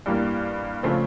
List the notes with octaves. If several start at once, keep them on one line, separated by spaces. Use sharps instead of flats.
G2 E3 G3 A#3
C#3 F3 A3 C4